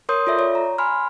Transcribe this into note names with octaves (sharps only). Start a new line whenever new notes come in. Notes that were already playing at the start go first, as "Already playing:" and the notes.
A#4 C#5 C6 D#6 G6
F4 A4 D5 E5
C#5
A#5
G#5 B5 C6 F6